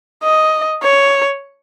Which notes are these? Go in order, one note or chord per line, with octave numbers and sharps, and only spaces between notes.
D#5
C#5